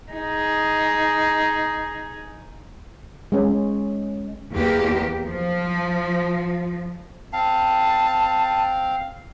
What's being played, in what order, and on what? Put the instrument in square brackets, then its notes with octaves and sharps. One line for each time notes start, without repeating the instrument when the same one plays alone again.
[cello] D#4 G#4
[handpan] G#3 C#4
[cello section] E2 A#3 G4
F3
[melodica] C4 F5 [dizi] A5